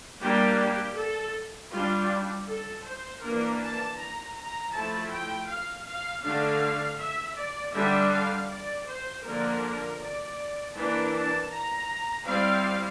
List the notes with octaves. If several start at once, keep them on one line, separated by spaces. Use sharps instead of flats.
G3 A#3 D4 G4
G4
A4
G3 D4 F4
A4
C5
E3 A#3 D4 A#4
A5
A#5
A#5
F3 A3 E4 A5
G5
F5
F5
D3 A3 D4 F5
E5
D5
D3 G3 D4 E5
F5
D5
C5
D3 F3 A#3 D4 A#4
D5
E3 A#3 D4 A5
A5
A#5
G3 C4 E4 F5